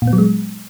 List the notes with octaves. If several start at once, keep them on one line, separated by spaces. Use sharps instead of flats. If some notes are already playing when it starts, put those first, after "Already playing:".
A#2
B3
F#3
G#3